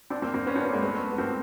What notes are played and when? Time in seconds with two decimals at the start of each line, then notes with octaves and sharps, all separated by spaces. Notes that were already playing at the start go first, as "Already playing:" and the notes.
0.10 C4 D4
0.22 A#3 C4
0.34 A#3 C4
0.46 B3 C#4
0.55 C4 D4
0.64 B3 C#4
0.73 G#3 A#3
0.82 A3 B3
1.12 B3
1.18 A#3 C4